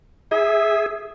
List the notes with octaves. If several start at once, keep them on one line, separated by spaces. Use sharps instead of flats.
G#4 E5